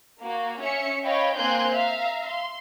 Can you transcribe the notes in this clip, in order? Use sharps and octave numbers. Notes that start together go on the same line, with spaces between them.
A#3 F#4
C#4 E5 C#7
C#5 D#5 F5 G5 B5
A#3 C4 G#5 C6 F#6 G6
E5 F5 A#5
C6